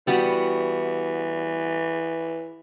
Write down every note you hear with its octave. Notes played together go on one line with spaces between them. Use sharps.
E3 G3 B3 F#4